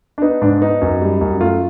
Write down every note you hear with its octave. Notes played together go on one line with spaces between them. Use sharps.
D4
B3 D#4
G#2 D4
B3 D#4
F#2
G3
F#2
A3 F4